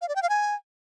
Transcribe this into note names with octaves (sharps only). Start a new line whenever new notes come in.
F5
D5
G5
F5
G#5